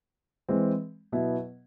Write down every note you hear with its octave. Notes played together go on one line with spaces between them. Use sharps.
E3 G#3 C4
B2 F#3 B3 E4